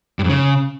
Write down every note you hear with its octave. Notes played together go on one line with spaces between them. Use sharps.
G2
F2
C#3